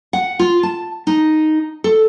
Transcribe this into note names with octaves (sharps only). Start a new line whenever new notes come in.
F#5
F4
A5
D#4
A4